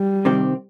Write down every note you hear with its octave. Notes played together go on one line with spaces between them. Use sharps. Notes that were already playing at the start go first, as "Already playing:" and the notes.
Already playing: G3
C3 D#3 C4 G4